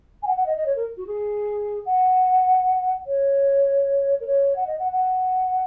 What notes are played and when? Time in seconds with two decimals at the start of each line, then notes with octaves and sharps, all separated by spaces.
0.22 G#5
0.26 F#5
0.37 F#5
0.46 D#5
0.57 D#5
0.66 C#5
0.76 A#4
0.97 F#4
1.06 G#4
1.86 F#5
3.06 C#5
4.20 A#4
4.26 C#5
4.56 F#5
4.66 D#5
4.79 F#5
4.92 F#5